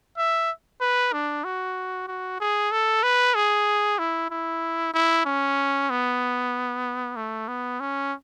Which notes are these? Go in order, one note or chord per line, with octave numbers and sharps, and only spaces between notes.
E5
B4
D4
F#4
F#4
G#4
A4
B4
G#4
E4
E4
E4
C#4
B3
A3
B3
C#4